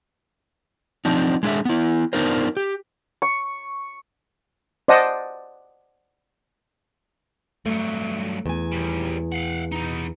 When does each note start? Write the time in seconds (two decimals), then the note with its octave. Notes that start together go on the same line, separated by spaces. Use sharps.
1.05 F3 C4 D4 D#4
1.43 G#3 D4 G#4 E5
1.65 B3 E4
2.13 B3 D4 D#4 F4 A#4 C5
2.57 G4
3.22 C#6
4.88 C5 D5 D#5 F#5 A5 D#6
7.66 G2 F#3 A3
8.46 E2 G#5
8.72 D#2 G3
9.32 F5 F#5
9.72 B3 D#4